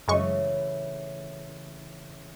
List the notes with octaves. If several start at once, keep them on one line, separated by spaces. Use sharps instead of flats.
F#2 A2 C#3 E3 G#3 C#6